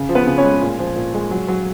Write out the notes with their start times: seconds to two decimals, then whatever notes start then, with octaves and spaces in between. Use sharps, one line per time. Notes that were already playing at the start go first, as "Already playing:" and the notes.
Already playing: C#3
0.09 F3
0.15 B3 B4
0.27 C#3
0.38 C#4 C#5
0.44 G#3
0.61 A#2
0.79 F3
0.96 A#2
1.14 G#3
1.31 F#3
1.48 F#3